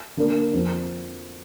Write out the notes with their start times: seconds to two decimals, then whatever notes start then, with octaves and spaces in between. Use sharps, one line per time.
0.17 D3 A#3 D4 A#4
0.53 F2 F3 C4